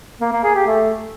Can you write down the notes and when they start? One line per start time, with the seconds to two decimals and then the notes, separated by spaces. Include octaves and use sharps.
0.21 A#3
0.32 A#3
0.44 G#4
0.55 G4
0.66 A3